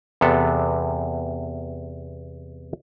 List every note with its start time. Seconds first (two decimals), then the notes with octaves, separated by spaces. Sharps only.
0.21 E2 C3 B3 A4